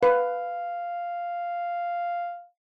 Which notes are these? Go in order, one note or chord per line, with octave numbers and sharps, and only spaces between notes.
B4 F5